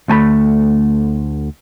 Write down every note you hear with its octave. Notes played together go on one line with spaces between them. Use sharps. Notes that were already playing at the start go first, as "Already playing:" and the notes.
D2 A3 G#5 B5